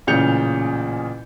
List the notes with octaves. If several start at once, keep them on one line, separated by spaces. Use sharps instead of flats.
A1 A#2 C#3 G6 C#7 F7